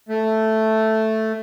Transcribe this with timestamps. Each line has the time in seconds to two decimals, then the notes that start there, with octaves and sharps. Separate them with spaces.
0.09 A3